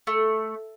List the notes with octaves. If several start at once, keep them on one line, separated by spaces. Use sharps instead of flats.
A3